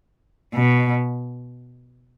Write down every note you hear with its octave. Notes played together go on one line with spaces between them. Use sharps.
B2